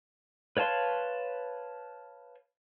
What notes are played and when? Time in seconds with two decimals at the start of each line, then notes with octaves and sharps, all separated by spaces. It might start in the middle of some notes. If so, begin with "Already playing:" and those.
0.57 B4 C#5 F5 A5 C6